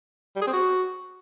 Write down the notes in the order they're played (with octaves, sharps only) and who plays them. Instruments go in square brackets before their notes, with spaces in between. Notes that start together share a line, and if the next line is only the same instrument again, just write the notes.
[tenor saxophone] G3
G#4
C4
F#4